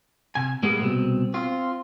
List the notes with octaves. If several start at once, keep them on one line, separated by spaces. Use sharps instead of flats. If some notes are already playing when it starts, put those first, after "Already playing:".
C3 G#5
A2 G3 G#3 A#3 B3
C2 B2 C4
C4 F4